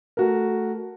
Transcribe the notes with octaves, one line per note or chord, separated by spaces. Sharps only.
A3 F#4 A#4